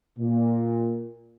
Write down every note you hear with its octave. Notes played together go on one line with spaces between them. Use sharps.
A#2